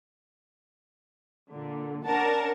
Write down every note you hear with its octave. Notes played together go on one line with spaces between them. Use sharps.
A#2 D3
C#4 D4 A#4 D5 F#5 A5